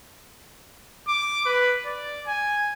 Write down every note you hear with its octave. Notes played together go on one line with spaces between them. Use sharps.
D6
B4
D5
G#5